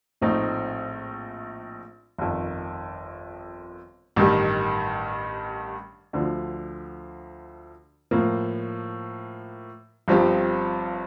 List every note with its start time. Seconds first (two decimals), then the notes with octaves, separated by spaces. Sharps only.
0.21 A#1 A2 A3 C4 D#4
2.19 G1 F2 D#3
4.16 A1 G2 D#3 G3
6.13 D2 D3 F3
8.11 A2 F3 A#3
10.08 G1 G2 F3 C4 G4